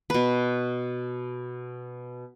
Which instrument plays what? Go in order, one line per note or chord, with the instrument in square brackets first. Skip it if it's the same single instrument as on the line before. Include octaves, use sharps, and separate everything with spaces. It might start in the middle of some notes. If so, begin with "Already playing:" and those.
[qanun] B2 B4